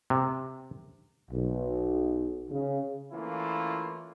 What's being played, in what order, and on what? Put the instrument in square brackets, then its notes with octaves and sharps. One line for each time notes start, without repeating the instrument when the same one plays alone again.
[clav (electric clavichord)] C3
[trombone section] B1
C#3
E3 A3 A#3 C#4 E4 F4